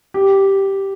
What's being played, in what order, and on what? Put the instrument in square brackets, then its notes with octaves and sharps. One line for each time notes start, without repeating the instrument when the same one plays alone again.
[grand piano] G4